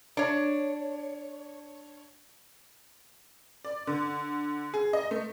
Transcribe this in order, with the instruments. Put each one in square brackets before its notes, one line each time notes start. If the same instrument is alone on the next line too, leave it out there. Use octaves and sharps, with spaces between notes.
[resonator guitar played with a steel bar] D4 C#5
[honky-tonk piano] D5
D3
G#4
D#5
A3